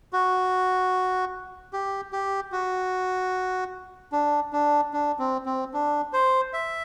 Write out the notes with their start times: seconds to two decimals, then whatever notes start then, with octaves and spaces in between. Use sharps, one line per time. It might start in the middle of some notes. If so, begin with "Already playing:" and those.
0.13 F#4
1.73 G4
2.12 G4
2.52 F#4
4.12 D4
4.53 D4
4.93 D4
5.19 C4
5.46 C4
5.73 D4
6.13 C5
6.53 E5